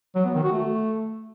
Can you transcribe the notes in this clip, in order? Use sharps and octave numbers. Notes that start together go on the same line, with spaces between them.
F#3
B3
D#3
F#4
A3